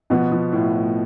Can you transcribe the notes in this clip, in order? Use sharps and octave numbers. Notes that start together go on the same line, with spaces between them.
B2 F3 B3
F3
A2
A2